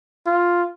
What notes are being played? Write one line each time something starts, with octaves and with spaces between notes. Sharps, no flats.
F4